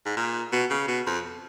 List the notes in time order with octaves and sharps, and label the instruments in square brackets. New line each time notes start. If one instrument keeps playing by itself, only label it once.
[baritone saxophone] G#2
A#2
B2
C#3
B2
F2